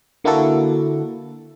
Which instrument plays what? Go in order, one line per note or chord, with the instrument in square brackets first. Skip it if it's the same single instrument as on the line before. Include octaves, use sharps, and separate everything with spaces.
[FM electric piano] D3 A#3 E4 F#4 A4